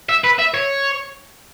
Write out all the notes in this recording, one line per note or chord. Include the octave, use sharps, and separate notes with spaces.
E5
B4
E5
C#5